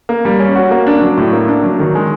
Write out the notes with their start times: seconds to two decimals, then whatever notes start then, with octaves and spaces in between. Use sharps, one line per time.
0.09 A#3
0.25 G3
0.40 C#4
0.55 F#4
0.71 A#3
0.87 D4
1.01 F#3
1.18 A2
1.32 A#3
1.48 D4
1.63 F#3
1.79 D#3
1.95 G#3